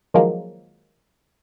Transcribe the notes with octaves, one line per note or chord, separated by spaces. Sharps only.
D#3 F3 F#3 G#3 A#3